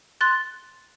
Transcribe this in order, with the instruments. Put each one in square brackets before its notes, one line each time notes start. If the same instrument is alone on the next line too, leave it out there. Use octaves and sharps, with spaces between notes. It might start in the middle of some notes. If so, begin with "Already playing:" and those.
[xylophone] C6 F#6 A6